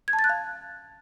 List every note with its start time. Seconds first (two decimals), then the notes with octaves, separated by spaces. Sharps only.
0.08 G#6
0.13 A5
0.19 A6
0.24 F#6
0.29 F5